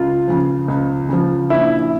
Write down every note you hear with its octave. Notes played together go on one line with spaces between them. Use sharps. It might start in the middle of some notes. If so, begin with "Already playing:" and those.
Already playing: C#2 F4
C#3 F3
C#2
C#3 F3
A#1 E4